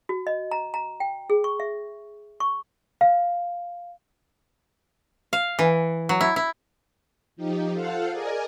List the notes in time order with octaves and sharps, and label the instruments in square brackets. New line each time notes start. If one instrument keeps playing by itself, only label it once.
[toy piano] F#4
D#5
A#5
A#5
G5
G#4
C#6
E5
C#6
[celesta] F5
[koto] F5
E3
F#3
E4
E4
[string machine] F3 D#4 G4
F4 A4 C5 F5 F#5
G#4 A#4 D5 D#5 G#5